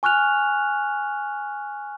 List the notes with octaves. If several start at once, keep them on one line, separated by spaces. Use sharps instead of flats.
G#5 C#6 F6 F#6 F7